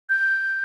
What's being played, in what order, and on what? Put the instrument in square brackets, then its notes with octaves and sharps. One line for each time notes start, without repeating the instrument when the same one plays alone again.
[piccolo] G6